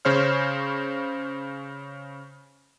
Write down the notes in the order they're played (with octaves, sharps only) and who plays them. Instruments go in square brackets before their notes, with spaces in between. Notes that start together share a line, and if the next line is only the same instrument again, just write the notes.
[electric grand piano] C#3 C#4 C5 C#5 F6